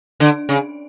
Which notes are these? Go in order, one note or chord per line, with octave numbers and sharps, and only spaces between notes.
D3
C#3